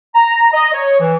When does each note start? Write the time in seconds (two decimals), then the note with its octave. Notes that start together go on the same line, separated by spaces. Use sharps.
0.16 A#5
0.53 D#5
0.74 C#5
1.00 E3